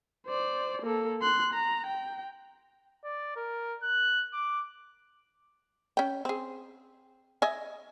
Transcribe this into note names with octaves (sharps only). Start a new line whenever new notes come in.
C5 D5
A#3 A4
C6 F#6
A#5
G5
D5
A#4
F#6
D6
C#4 G5
C4 G#4
D#5 E5 G#5